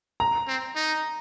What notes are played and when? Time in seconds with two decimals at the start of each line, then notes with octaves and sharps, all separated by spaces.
0.20 A#5
0.48 C4
0.76 D#4